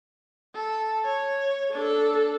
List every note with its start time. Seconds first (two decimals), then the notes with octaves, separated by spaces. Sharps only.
0.55 A4
1.05 C#5
1.74 D4 A4